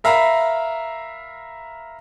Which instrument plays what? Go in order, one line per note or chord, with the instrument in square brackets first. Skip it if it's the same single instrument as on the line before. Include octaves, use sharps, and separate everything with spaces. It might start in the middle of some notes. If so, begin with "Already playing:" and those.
[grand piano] A#4 E5 F5 A#5 B5